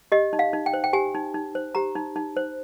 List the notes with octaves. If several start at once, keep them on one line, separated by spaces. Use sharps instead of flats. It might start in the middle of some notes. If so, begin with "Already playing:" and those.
G4 D#5
D#4
F5
D#4
G5
C5
G5
G4 G#5
D#4
D#4
C5
G4 A#5
D#4
D#4
C5